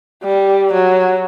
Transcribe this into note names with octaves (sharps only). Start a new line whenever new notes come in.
G3
F#3